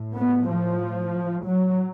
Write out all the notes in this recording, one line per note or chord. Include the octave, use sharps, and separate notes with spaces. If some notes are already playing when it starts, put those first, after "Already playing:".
Already playing: A2
B3
F3
F#3